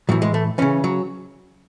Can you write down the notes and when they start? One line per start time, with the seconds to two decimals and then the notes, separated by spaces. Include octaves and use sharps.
0.09 A2 E3 F#3
0.22 G#3
0.34 A3
0.58 C#3 E3 C#4
0.84 F#3